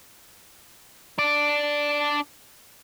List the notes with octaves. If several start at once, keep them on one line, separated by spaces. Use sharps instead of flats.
D4 D5